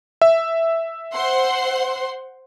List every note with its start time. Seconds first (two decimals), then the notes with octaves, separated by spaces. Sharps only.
0.22 E5
1.15 C5 F#5 C6